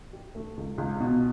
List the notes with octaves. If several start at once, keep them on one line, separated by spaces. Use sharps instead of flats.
G4
A3
C#2
C#2
B2